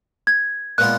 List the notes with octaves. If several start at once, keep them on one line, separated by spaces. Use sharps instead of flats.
G#6
A#2 G#3 B3 F4 F#6